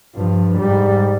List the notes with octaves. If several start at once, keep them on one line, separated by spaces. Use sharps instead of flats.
G2 F3
G#2 G3